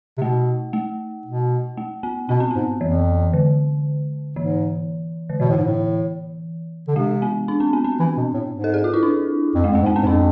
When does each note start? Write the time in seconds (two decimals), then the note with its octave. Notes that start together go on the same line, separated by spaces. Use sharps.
0.17 C3
0.22 B2 A3
0.73 A3
1.26 B2
1.77 A3
2.03 B3
2.29 B2 B3
2.40 C4
2.51 G#2 B3
2.81 F2 E3
3.33 D3
4.36 G#2 E3
5.30 D3
5.40 B2 E3
5.49 A2
5.57 G#2
5.64 A2
6.88 D3
6.96 C3 G#3
7.22 B3
7.48 D4
7.60 C4
7.73 B3
7.84 C4
7.99 E3
8.17 B2
8.34 A2
8.51 G#2
8.64 A4
8.74 G#4
8.84 F4
8.94 E4
9.03 D4
9.55 F2
9.64 G#3
9.71 F2 A3
9.81 G#2
9.86 B3
9.96 C4
10.03 G#2
10.07 F2 D4